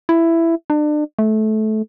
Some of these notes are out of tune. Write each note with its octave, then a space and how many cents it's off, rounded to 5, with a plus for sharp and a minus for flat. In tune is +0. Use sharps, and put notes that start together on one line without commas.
E4 +10
D4 +35
A3 -20